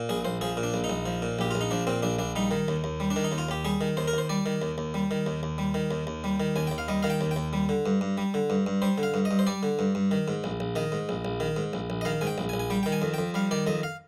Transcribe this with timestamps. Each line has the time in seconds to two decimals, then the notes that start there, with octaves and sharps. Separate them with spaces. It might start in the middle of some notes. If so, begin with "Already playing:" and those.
Already playing: A#2
0.09 A#1 G#4
0.25 A#1 C5
0.41 F3 G#4
0.57 A#2
0.63 D4
0.74 A#1
0.84 D#4
0.90 A#1
1.06 F3
1.22 A#2
1.39 A#1 G4
1.51 A#1 F4
1.61 D#4
1.71 F3 D4
1.87 A#2 C4
2.03 A#1 D4
2.19 A#1 D4
2.36 G3 D#4
2.51 D#3
2.68 D#2
2.84 D#2
3.00 G3
3.11 D4
3.16 D#3
3.24 D#4
3.32 D#2
3.38 F4
3.49 D#2 G4
3.65 G3 G#4
3.81 D#3
3.97 D#2 C5
4.08 A#4
4.13 D#2 C5
4.29 G3 D5
4.46 D#3
4.62 D#2
4.78 D#2
4.94 G3
5.11 D#3
5.26 D#2
5.43 D#2
5.58 G3
5.74 D#3
5.91 D#2
6.07 D#2
6.24 G3
6.40 D#3
6.56 D#2 G#5
6.67 D#2 G5
6.78 F5
6.88 G3 D#5
7.03 D#3 F5
7.10 G5
7.21 D#2
7.31 G5
7.36 D#2
7.53 G3
7.69 D3
7.86 G2
8.01 G2
8.18 G3
8.34 D3
8.50 G2
8.67 G2
8.82 G3 C5
8.98 D3
9.03 F5
9.14 G2
9.25 D#5
9.31 G2
9.39 C5
9.47 G3 D5
9.63 D3
9.79 G2
9.95 G2
10.11 D#3
10.28 G#2
10.44 A#1
10.60 A#1
10.75 D#3 D#5
10.92 G#2
11.09 A#1
11.25 A#1
11.40 D#3
11.56 G#2
11.73 A#1
11.90 A#1
12.01 D#5
12.05 D#3 F5
12.21 G#2 G#5
12.27 G5
12.38 A#1
12.49 G#5
12.54 A#1
12.59 G#5
12.70 G3 G5
12.83 D#3 G5
12.92 G#5
13.02 F2
13.14 F2 G5
13.34 G3 F5
13.51 D#3 D5
13.67 F2 D#5
13.83 F5